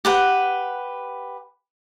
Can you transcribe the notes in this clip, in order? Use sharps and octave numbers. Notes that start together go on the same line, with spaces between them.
G4 B4 F#5